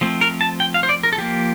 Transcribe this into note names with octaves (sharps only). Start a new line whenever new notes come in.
F3 A3 C4
A#4
A5
G5
F5
C5
D5
A#4
A4
F3 A#3 G4